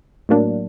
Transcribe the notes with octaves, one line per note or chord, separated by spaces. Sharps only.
A2 F#3 A#3 D4